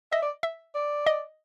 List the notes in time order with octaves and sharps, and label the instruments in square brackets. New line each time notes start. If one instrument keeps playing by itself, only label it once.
[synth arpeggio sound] D#5 [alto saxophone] E5
[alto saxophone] D5
[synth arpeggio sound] E5
[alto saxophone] D5
[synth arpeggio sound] D#5